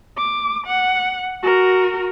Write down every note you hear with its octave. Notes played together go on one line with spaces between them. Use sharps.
D6
F#5
F#4 A#4